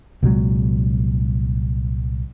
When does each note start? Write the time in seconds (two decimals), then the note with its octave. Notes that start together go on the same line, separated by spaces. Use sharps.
0.23 C2 A#2 F#3 G#3